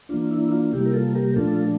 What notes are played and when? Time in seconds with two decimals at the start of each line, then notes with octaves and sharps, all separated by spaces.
0.09 E3 A#3 D4 F4
0.31 E4
0.52 F4
0.73 C3 G3 A#3 E4 G4
0.86 A#4
0.94 F4 A4
1.15 G4 A#4
1.36 A#2 F3 A3 D4 F4 A4